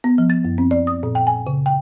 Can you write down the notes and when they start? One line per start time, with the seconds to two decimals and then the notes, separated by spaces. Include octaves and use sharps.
0.04 B3
0.18 F3
0.30 A6
0.44 F#2
0.58 C4
0.71 D5
0.87 D#6
1.03 A#2
1.15 G5
1.27 G#5
1.47 C#3
1.66 G5